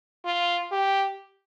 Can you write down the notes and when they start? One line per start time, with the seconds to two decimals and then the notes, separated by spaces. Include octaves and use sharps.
0.25 F4
0.72 G4